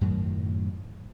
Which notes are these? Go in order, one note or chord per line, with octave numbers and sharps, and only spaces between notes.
F#2 A2 D#3 F#3